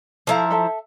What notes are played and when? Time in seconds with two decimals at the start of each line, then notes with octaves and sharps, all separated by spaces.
0.27 F3 E4 A4 F5 A#5
0.51 A4 E5 A5